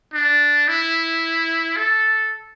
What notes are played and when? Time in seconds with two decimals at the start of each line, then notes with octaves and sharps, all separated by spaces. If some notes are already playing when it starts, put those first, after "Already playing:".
0.13 D4
0.68 E4
1.76 A4